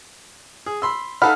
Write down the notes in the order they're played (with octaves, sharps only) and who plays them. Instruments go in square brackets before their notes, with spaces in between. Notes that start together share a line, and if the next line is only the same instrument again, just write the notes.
[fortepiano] G#4
B5 C6 E6
[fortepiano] D#4 A4 F5 [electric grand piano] F#5 B5 F6